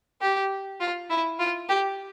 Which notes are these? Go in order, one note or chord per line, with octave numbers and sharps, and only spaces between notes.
G4
F4
E4
F4
G4